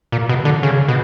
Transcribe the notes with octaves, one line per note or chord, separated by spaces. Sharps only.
A#2
B2
D3
C#3
B2